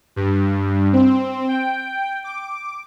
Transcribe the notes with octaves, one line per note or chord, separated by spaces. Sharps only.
G2
C4
G5
D6